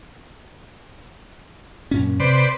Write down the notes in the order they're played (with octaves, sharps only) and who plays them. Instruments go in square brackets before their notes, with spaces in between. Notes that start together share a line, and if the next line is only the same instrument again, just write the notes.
[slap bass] F#2 A#2 C#4
[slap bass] C3 [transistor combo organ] B4 C5 D5